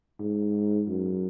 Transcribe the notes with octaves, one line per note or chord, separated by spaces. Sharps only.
G#2
F#2